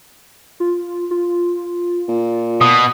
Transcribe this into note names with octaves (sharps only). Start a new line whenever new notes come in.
F4
F4
A#2
B2 D#6